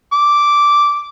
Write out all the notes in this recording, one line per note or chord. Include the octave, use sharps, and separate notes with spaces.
D6